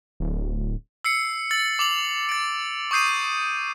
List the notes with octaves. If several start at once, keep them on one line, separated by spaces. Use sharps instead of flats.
D1
E6 C7 C#7
E6 A6 F#7
D6 F7 F#7
A6 D7
C#6 D#6 G6 C7 D#7